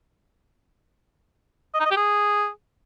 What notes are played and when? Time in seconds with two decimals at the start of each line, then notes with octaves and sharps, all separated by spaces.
1.74 D#5
1.80 D#4
1.85 D#5
1.91 G4
1.97 G#4